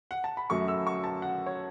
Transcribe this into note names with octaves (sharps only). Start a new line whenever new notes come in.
F#5
A5
B5
F#2 F#3 A3 C#6
E6
C#6
A5
F#5
C#5